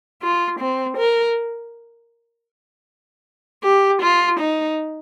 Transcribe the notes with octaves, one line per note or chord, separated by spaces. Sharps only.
F4
C4
A#4
G4
F4
D#4